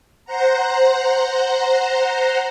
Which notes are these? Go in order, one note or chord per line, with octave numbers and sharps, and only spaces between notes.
C5 F#5 A#5